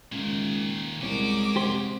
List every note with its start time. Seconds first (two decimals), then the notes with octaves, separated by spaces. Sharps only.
0.12 C#2 A#2 D#3
1.02 C2 G#3 C#4 F#4 A#4 D6
1.56 C3 G4 C5